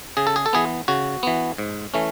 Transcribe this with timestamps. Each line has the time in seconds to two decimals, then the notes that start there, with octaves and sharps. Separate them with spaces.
0.17 C#3 G#4
0.27 A4
0.36 G#4
0.46 A4
0.53 E3 B3 G#4
0.88 C#3 F#4
1.23 E3 B3
1.58 G#2
1.94 E3 A3 C#4